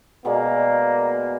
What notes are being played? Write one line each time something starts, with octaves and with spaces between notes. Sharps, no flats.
B2 G#3 A#3 D5